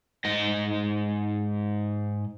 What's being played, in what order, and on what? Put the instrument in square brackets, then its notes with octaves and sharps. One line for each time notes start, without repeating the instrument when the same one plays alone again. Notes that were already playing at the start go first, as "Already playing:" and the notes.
[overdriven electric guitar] G#2 D#5